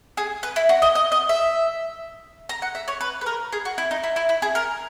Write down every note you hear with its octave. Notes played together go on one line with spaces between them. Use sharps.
G#4
B4
E4
F#4
D#5
D#5
D#5
E5
A#5
F#5
E5
C#5
B4
B4
A#4
G#4
F#4
E4
D#4
E4
E4
E4
G#4
A#4